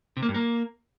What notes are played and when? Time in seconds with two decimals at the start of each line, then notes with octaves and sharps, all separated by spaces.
0.17 C3
0.23 A#3
0.29 G2
0.34 A#3